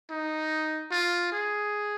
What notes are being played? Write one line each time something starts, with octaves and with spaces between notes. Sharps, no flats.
D#4
F4
G#4